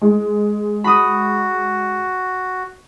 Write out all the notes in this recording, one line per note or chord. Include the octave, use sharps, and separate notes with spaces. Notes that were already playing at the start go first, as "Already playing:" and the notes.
G#3
F#4 B5 D#6